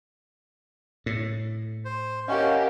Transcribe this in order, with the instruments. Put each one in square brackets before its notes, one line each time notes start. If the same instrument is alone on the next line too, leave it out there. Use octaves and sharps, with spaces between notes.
[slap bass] A2
[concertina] C5
[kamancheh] A#3 G4 [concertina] C#4 [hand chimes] D#5 F#5 G6